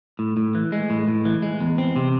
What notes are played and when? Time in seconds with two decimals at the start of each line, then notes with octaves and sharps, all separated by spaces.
0.19 A2
0.37 A2
0.55 E3
0.72 G#3
0.90 A2
1.08 A2
1.25 E3
1.42 G#3
1.60 E2
1.78 C4
1.96 C3